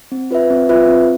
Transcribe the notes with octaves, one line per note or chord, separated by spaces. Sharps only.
C4
F4 B4 E5
C4
F4 B4 E5
C4